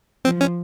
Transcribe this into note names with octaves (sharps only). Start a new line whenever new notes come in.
F3 C4
C#4